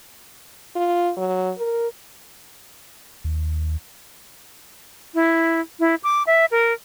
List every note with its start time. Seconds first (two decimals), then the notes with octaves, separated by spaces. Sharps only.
0.76 F4
1.17 F#3
1.58 A#4
3.24 D#2
5.14 E4
5.80 E4
6.03 D6
6.27 E5
6.51 A#4